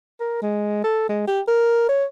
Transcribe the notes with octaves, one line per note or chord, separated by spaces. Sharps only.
A#4
G#3
A4
G#3
G4
A#4
C#5